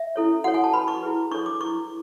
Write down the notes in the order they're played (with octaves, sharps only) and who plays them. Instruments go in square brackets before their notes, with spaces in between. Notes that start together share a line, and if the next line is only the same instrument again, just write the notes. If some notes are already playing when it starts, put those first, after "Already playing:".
Already playing: [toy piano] E5
C#4 E4 A4 C#5
F#4 A4 C#5 F#5
G#5
A5
F#4 B4 B5
C#6
E4 G#4 B4
D4 A4 C#5 C#6
D6
E4 B4 C#6